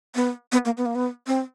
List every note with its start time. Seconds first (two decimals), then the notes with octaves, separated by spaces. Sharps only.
0.15 B3
0.52 B3
0.65 A#3
0.77 B3
0.86 A#3
0.95 B3
1.27 C4